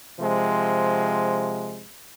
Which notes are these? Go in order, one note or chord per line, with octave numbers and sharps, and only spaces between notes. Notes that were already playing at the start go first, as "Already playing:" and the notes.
C3 F3 G#3